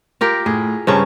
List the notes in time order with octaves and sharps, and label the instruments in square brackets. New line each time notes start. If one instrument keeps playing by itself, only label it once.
[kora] F4 G4 A#4
[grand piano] A2 [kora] G#4
[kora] G2 C#3 C#4 [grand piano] C5 A5 A#5